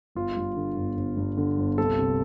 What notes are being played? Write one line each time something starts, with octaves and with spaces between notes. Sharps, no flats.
G1 F4
G2
D3
G1
G1
G2
D3
G1
C2 A4
C3